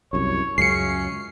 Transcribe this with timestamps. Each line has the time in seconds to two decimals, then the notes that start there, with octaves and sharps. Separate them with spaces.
0.13 C2 F#2 C#5
0.58 C#2 F#2 C#3 C#4 C7 C#7